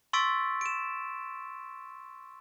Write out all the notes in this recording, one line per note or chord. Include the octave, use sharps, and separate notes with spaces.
C6 C#6 E6 A6 B6 D7
D7 E7